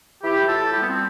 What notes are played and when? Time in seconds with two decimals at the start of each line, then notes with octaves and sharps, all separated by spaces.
0.23 E3 E4 G4
0.47 A2 F4 A4
0.71 G3 E4 G4
0.81 B3
0.88 C4